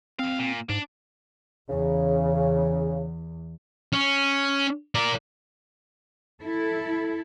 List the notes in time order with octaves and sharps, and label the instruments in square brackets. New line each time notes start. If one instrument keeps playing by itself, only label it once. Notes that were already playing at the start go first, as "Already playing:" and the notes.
[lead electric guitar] F2 F5 [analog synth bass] C4
[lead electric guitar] A#2
[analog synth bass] G#2 [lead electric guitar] D4
[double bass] E2 [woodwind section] C#3
[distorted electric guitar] C#4
A#4 D5
[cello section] E4 A4